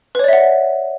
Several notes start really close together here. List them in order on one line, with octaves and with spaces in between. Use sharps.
B4 C#5 D5 E5 F#5